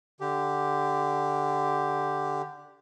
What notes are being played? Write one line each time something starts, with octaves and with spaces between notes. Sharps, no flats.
D3 G4